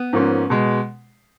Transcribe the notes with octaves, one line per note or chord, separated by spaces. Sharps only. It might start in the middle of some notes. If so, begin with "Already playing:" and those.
Already playing: B3
G#2 F3 A#3 C#4
B2 G#3